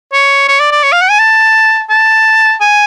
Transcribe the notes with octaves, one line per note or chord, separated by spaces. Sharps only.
C#5
C#5
D5
D5
C#5
F5
F#5
G#5
A5
A5
G#5